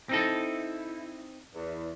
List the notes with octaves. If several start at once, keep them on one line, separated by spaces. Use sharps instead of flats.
C4 D#4 E4 A4
E2